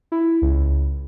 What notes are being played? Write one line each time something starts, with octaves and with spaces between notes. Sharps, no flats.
E4
C#2